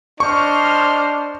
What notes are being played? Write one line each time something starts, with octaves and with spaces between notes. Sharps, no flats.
D4 C5 D#5 C#6 F6